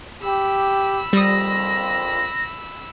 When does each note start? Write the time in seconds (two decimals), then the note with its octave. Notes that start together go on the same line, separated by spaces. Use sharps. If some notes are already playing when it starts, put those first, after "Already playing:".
0.22 G4 B5 E6
1.13 A#1 F2 G3 C4 D#6 A#6